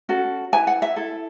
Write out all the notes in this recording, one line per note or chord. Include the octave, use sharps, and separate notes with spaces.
C#4 F#4 A4
E4 B4 G#5
F#5
E5
E4 A4